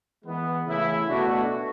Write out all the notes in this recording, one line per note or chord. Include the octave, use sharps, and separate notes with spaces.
E3 G#3 B3
C#3 E3 A3 E4
B2 A3 D4 F#4